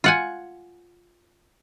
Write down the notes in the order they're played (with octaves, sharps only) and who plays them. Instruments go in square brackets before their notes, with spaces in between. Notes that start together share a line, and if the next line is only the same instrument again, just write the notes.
[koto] F4 F#5 G#5